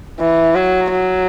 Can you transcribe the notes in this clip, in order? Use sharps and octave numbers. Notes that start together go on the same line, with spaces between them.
E3
F#3
F#3